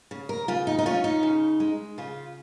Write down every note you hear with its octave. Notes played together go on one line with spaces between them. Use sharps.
C#3
A#4
C#3 F4
D#4
D#4
C#4 F4
D#4
C#3
G#3
C#3 F4